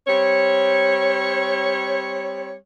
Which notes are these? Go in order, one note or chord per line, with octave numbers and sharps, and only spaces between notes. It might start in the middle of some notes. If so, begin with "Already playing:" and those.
G3 C4 C#5